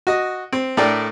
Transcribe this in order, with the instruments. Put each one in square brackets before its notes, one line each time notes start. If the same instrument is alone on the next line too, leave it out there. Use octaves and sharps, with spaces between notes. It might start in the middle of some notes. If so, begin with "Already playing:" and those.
[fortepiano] F#4 D#5
C4
A2 A3 D4 A#4 D5 G5